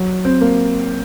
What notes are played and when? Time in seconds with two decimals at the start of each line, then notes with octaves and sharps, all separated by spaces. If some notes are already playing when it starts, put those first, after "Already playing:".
Already playing: F#3
0.25 C4
0.41 A#3